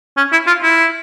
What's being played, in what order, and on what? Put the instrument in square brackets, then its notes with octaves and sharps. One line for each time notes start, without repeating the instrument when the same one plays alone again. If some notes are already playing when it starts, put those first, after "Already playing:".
[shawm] C#4
E4
F4
E4